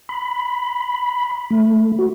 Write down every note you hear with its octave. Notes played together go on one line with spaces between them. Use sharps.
B5
A3
F#4